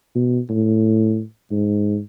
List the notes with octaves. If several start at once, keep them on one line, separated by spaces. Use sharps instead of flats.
B2
A2
G#2